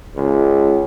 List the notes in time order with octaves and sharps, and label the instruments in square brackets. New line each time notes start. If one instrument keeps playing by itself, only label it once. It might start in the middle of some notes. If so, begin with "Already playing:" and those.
[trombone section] C#2